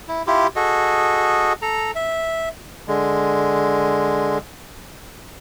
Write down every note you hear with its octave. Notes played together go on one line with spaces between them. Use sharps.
E4
E4 F4 G4
F#4 G#4 A4 D#5
A4 A#5
E5
D3 G#3